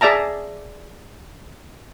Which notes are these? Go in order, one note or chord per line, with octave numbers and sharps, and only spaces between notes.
G#4 D5 E5 A5 A#5